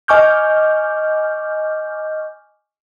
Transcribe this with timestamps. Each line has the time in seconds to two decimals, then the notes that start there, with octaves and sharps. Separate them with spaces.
0.08 D#5 G#5 C#6 D6 F6 G6